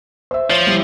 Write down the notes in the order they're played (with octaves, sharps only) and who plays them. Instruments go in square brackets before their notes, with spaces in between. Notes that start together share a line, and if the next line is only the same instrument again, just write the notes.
[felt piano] C5 E5
[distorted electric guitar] F3 [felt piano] C#5
[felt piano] G3 E4